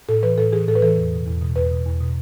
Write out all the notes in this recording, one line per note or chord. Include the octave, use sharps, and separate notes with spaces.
A2 A4
E3 B4
A2 A4
E3 G#4
A2 A4
B4
E3 A4
E2
B2
E2
B2
E2 B4
B2
E2
B2